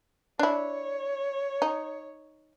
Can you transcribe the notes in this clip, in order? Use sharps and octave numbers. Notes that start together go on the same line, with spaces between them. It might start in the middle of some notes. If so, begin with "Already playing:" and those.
D4 E4 C#5
D#4